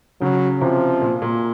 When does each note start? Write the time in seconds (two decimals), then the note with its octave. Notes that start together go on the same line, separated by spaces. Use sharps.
0.21 C#3 F#3
0.61 C3 F3
1.02 A#2
1.22 A#2